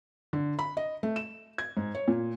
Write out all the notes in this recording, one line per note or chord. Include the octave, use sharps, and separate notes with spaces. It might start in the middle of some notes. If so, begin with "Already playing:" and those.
D3
B5
D#5
A3
E7
G#6
G#2
C#5
A#2